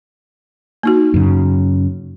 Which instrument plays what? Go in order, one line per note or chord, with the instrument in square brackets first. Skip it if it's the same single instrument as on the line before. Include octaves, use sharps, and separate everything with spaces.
[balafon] A#3 D#4 F#4
[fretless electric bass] F#2 C#3